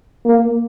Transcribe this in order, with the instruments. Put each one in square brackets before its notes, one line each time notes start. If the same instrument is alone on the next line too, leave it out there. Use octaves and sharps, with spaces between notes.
[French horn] A#3